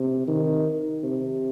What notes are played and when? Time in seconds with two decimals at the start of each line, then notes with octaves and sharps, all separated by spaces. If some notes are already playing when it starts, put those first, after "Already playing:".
Already playing: C3
0.28 D#3
1.04 C3